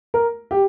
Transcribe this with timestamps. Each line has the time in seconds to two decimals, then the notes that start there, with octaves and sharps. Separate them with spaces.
0.14 A#4
0.51 G4